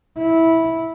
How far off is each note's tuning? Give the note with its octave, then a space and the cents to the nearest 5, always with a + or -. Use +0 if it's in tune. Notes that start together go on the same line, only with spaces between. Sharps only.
E4 -15